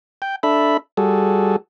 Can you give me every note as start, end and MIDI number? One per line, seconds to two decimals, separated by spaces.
0.22 0.36 79
0.43 0.77 62
0.43 0.77 69
0.43 0.77 76
0.43 0.77 83
0.97 1.56 55
0.97 1.56 66
0.97 1.56 68
0.97 1.56 69